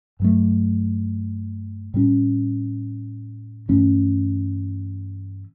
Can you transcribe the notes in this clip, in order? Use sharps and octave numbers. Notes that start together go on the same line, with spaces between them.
G2 F#3 A3
A2 G3 C#4
G2 E3 A3 C#4